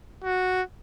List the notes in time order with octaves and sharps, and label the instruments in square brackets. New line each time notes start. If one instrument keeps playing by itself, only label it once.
[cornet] F#4